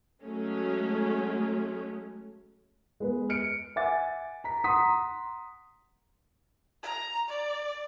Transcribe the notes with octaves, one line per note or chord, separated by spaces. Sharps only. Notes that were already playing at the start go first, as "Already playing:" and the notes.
F#3 G#3 A3 C#4
G#3 B3 B4
F6 C#7 D7
E5 F#5 G#5 D6 A6
A#5 B6
F#5 A#5 C6 D#6 B6
A#5
D5